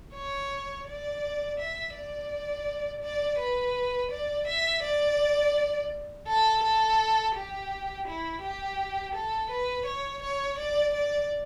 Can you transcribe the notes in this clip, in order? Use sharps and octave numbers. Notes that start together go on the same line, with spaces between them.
C#5
D5
E5
D5
D5
B4
D5
E5
D5
A4
A4
G4
E4
G4
A4
B4
C#5
C#5
D5
D5